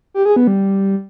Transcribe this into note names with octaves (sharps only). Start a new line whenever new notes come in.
G4
G#4
B3
G3